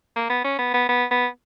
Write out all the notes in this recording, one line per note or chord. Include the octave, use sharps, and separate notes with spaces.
A#3
B3
C#4
B3
B3
B3
B3